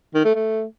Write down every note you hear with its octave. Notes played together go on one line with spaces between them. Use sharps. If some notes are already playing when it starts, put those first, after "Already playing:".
D#3
A3
A3